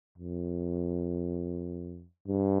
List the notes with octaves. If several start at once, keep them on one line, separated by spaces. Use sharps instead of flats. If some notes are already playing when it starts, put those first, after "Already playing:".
F2
G2